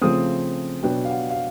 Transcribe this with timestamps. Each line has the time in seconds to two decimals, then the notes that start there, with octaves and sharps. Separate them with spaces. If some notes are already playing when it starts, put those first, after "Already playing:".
0.01 C#3 F3 A3 C4 D#6
0.82 B2 F#3 B3 D4 G5
1.05 F5
1.10 F#5
1.30 F5